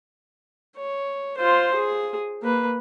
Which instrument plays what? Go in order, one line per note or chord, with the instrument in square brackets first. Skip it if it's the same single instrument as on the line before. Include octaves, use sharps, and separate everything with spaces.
[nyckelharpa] C#5
F4 C5
G#4
A#3 B4